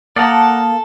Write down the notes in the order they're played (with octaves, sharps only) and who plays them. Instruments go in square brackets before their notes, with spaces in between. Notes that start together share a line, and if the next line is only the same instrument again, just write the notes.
[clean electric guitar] A#3 [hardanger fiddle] A4 [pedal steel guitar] D5 F#5 A#5 [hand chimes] A5 D#6 F6